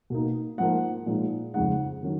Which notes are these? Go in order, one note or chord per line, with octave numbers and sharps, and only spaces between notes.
B2 A#3 D#4
G#2 F3 A#3 D#4 F#5
A#2 F3 G#3 D#4
F2 C#3 G#3 D#4 F#5
D#3 F#3 C#4